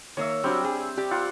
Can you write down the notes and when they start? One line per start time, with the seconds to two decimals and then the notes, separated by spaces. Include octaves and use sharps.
0.17 D#3 A#3 C#5 E5
0.44 F#3 G3 C4 D4 F#4 G5
0.64 G#4
0.97 G4 D5
1.11 F4 F#5 B5